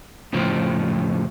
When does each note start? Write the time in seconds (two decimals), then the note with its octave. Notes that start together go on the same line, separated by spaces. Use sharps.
0.33 F2 A2 C#3 F3 C4